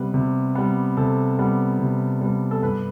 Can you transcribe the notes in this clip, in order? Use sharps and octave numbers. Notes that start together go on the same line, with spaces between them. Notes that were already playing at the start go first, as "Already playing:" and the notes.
Already playing: C3 G3 B3 B4
C3
G3 B3
C3 A4
G3 B3
C3
G3 B3
A4
G2 B4